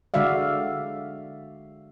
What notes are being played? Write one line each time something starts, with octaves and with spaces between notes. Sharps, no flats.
D3 G#3 F#4 D5 E5 F5